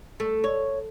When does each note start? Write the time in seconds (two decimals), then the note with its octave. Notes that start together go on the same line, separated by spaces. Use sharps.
0.20 A3
0.44 C#5